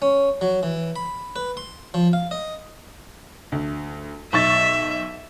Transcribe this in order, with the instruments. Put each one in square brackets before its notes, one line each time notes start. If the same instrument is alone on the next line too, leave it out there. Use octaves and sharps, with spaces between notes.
[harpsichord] C#4
F#3
E3
B5
B4
C6
F3
F5
D#5
[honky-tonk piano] D2
[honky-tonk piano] B1 C#6 A6 [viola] E5